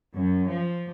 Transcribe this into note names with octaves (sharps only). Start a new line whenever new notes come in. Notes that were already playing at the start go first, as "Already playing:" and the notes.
F#2
F3